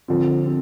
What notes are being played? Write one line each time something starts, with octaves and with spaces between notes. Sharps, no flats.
D3 F3 C4
C4